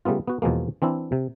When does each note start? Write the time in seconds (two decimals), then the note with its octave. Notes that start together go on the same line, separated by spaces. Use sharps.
0.05 C#3 G3 A3 B3 F4
0.28 B3 F#4
0.42 E2 B2 F3 G#3 A#3
0.82 E3 C4 D4 E4
1.12 C3